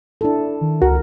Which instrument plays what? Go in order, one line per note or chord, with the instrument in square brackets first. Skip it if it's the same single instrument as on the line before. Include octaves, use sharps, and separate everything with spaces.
[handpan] D4 E4 A4
[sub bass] D#3
[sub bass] C#2 [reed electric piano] F#4 [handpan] A#4